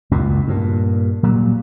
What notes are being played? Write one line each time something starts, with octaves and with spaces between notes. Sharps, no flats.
C#2 F#2 A#2
G2 A#2
A#2 F#3 G3